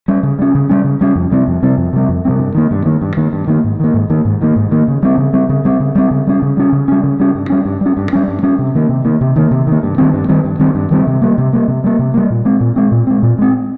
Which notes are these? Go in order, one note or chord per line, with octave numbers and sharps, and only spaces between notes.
G3 C#4
C#3
G3 C#4
C#3
G3 C#4
C#3
G3 C#4
F2
C3 G3 C4
F2
C3 G3 C4
F2
C3 G3 C4
F2
C3 G3 C4
G2
D#3 A#3
G2
D#3 A#3
G2
D#3 A#3
G2
D#3 A#3
G#2
D#3 A#3
G#2
D#3 A#3
G#2
D#3 A#3
G#2
D#3 A#3
C#3
G3 C4
C#3
G3 C4
C#3
G3 C4
C#3
G3 C4
C#3
G3 C#4
C#3
G3 C#4
C#3
G3 C#4
C#3
G3 C#4
G2
G3 C#4
G2
G3 C#4
G2
G3 C#4
G2
G3 C#4
C3
D#3 A#3
C3
D#3 A#3
C3
D#3 A#3
C3
D#3 A#3
G2
D#3 G3 C4
G2
D#3 G3 C4
G2
D#3 G3 C4
G2
D#3 G3 C4
C3
G3 A#3
C3
G3 A#3
C3
G3 A#3
C3
G3 A#3
A#2
G#3 C4
A#2
G#3 C4
A#2
G#3 C4
A#2
G#3 C4